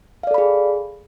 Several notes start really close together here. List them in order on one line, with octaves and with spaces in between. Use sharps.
F5 D5 A4 B5 G#4